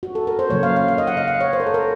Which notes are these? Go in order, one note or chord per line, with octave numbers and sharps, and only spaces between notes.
F#4
A4
A#4
C5
C#3 F#3 A#3 C#5
F5
F5
F5
D#5
F#5
F5
F5
C#5
C5
A#4
A4
A#4